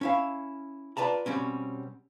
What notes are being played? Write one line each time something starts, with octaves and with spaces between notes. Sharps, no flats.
C#4 E4 F5
F4 B4 D5 A5 A#5
B2 G3 C4 C#4